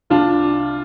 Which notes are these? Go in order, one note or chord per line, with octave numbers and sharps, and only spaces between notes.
C2 D4 F4